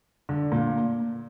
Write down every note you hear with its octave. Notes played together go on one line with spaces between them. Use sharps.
D3
A#2